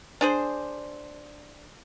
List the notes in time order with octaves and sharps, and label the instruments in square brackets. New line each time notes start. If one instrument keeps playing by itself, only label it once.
[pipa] D4 G#4 C5